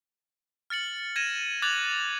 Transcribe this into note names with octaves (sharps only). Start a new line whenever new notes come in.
F6 A6 C#7 F#7
G#6 A#6 D#7 E7
D6 F#6 G#6 A6 F7 F#7